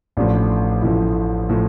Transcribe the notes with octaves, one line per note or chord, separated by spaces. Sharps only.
A1 A2 F3 D4
A1 A2 F3 E4
A2 F3